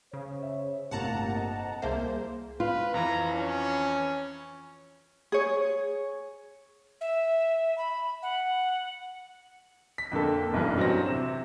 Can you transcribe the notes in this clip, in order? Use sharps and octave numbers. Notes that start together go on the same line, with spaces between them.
C#3 C5 C#5
E5
G1 A2 C3 A#3 F#5 A5 A#5
F2 C4 D#5
C2 A2 F3 A#3 G#4 C5 E5
F4 B4
F2 E3 A#5
C#4
G#4 C#5
E5
B5
F#5
B6
F2 D3 A#3 A4
F#1 B1 G2 E3
F#3 C4 A#6
C3 E7